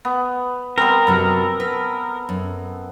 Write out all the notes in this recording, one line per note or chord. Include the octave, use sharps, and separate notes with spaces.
B3
G3 B3 C4 A#4 B4
F#2 C3 F#3 A4
B4
F#2